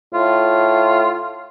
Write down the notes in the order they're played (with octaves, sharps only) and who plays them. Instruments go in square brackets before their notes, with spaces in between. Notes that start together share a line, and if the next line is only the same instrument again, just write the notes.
[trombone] A2 [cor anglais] F4